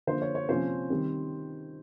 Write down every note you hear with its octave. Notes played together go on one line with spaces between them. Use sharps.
D3 F3 A#3 D4 C5
C#5
C#5
C3 F3 A#3 C#4 C5
D#3 G3 C4